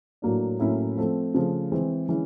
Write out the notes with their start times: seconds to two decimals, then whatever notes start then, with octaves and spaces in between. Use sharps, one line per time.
0.22 A2 F#3 A#3 D4
0.59 A2 F#3 A#3 C#4 E4
0.96 F3 A3 C4
1.34 C#3 F3 A3
1.72 E3 G#3 C4
2.09 E3 G#3 C#4 E4